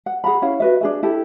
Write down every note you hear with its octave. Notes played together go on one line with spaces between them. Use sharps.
F#5
G#4 F#5 A#5 B5
C#4 E4 C#5 F5
F#4 B4 E5
D4 G#4 E5
E4 G4 A4